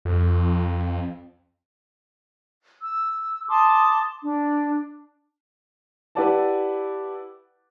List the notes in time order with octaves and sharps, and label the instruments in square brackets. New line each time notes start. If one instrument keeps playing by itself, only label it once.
[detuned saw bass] F2
[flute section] E6
A5 C6 D6 D#6
D4
[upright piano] E4 G4 B4 D5 F#5 A5